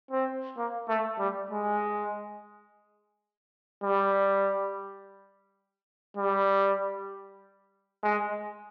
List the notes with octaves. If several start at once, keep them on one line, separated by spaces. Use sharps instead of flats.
C4
A#3
A3
G3
G#3
G3
G3
G#3